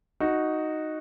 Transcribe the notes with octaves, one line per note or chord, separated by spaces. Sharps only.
D#4 F#4